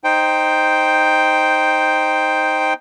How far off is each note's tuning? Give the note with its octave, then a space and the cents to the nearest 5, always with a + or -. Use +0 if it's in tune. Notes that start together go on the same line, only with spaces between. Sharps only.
D#4 +0 C5 +0 G5 +0